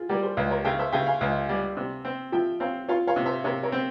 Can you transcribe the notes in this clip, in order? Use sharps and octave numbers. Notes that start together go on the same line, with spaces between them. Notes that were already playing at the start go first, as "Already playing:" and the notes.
Already playing: E4 F4 G#4
G3 G4 A#4
G#4 C5
C#2
A#4 C#5
C#3 E5 G5
C5 E5
C#3 E5 G5
F5 G#5
C#2
G3
C3
C4
F3 E5 G5
C4 C#5 F5
F4 C#5 F5
C#5 F5
C3
C5 E5
C3 A#4 C#5
A#4 C#5
C4